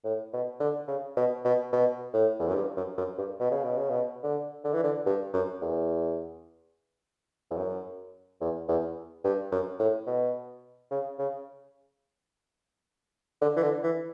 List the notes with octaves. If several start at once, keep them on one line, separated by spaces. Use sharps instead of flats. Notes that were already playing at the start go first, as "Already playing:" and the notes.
A2
B2
D3
C#3
B2
B2
B2
A2
E2
F#2
G2
F#2
F#2
G2
B2
C#3
B2
C#3
B2
D3
D3
E3
D3
G2
F#2
E2
E2
F#2
E2
E2
G2
F#2
A2
B2
C#3
C#3
D3
E3
D3
E3